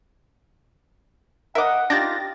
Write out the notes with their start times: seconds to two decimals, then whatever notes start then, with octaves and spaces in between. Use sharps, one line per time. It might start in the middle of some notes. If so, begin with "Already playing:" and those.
1.55 A#4 D#5 E5 F#5 D6
1.90 D4 D#4 F4 G4 D6 G6 A6 A#6